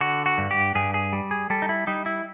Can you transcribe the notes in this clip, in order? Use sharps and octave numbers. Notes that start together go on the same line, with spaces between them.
D3 F#4
F#4
G2
G4
G2 G#4
G#4
G3
G#4
G3 A4
D#4
E4
G3 D#4
E4